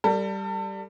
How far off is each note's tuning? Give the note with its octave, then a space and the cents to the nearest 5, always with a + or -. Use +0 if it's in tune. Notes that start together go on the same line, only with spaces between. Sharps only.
G3 +0 A4 +35